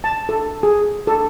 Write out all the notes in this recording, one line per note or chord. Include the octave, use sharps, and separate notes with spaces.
A5
A4
G#4
A4